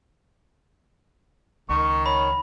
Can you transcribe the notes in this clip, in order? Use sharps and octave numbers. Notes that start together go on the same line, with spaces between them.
C#2 D#3 C#6
C#5 B5